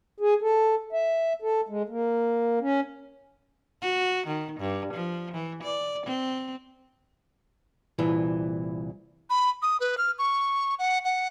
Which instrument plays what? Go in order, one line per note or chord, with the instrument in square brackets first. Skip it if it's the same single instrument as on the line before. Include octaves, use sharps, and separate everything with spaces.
[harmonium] G#4
A4
E5
A4
G#3
A#3
C#4
[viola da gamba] F#4
D#3
G2
F3
E3
D5
C4
[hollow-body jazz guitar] C2 A#2 E3
[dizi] B5
D#6
B4
F6
C#6
F#5
F#5